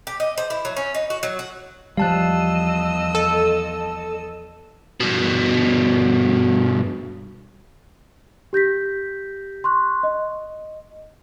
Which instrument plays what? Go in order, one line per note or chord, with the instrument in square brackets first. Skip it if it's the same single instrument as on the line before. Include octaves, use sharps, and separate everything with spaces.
[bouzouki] G4
D#5
C5
E4
F#3
C#4
D#4
F#4
F#3
F#4
[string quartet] E2 D#5 E6 [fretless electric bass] F3 G3 [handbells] F5 A5 F#6
[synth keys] A4
[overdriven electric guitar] G2 B2
[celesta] G4 G6 A#6 B6
C6 C#6 F#6
D#5